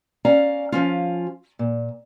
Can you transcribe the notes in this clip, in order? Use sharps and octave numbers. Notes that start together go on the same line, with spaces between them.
C#4 D5 F5 A#5
F3 C#4 F4
A#2